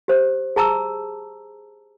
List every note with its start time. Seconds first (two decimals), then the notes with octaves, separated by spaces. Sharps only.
0.08 G4 C5 D6
0.56 G#4 A5 A#5 D6 E6